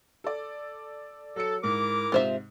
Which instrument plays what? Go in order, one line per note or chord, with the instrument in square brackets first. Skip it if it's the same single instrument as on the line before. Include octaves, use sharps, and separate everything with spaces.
[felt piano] A4 D5
[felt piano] F#3 C#7 [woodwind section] A4
[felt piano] G#2 [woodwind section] E4 A#4 D6
[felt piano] G#2 C3 [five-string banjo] F4 C5 E5